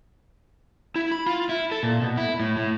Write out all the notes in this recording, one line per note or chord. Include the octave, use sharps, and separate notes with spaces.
E4
B5
F4
E4
A4
A#2
B2
E4
A2
A2